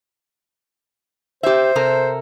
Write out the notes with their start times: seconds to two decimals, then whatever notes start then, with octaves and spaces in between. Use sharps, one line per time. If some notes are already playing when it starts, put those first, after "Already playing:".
1.43 G4 C5 E5
1.76 C3 A4 A#4